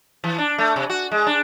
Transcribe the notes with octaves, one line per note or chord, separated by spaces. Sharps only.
E3
D4
A3
C3
F#4
G#3
D4